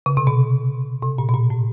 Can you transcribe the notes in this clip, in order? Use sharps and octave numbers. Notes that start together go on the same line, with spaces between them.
C#3
C3
B2
C3
A#2
B2
A#2
A2